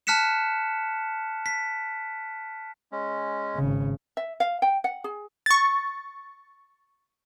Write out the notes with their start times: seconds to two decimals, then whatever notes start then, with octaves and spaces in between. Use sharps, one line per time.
0.07 A5 F6 F#6 B6 C#7 E7
1.46 B6
2.92 G#3 C#4
3.56 G#1 C#3
4.17 E5
4.40 F5
4.62 G5
4.84 F#5
5.04 G#4
5.46 C#6 A6